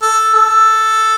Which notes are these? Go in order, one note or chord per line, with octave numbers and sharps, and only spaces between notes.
A4
A4